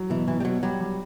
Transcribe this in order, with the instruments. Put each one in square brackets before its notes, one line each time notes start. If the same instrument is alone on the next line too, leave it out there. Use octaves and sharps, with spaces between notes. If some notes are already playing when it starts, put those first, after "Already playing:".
Already playing: [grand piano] F#3
[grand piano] B2 [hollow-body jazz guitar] E3
[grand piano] B2 [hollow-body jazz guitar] E3
[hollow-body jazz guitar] G3
[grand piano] B2 [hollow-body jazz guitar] F#3
[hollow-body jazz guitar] F#3 [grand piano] G3
[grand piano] G3